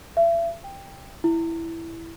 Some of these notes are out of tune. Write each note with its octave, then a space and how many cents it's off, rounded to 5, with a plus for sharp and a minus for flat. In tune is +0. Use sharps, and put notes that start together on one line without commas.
E5 +35
G5 +10
E4 +5